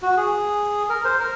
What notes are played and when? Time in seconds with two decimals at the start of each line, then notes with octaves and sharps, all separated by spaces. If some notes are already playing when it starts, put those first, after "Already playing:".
0.02 F#4
0.17 G#4
0.89 A#4
1.05 C5
1.19 A#4